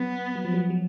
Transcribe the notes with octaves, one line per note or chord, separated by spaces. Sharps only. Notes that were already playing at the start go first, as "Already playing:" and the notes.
Already playing: F#3 B3
F#3
F3
F#3
F#3